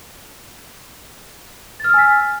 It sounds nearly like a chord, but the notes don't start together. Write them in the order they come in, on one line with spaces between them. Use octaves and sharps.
A6 F6 E6 G#5 B6